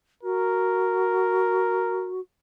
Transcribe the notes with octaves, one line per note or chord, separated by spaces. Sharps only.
F#4 A#4